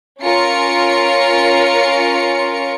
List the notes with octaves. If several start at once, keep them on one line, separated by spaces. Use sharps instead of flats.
C#4 F4 A#4 C#7